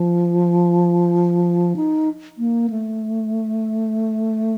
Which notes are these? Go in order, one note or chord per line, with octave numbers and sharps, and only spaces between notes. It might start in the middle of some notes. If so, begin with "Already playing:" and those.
Already playing: F3
D#4
A#3
A3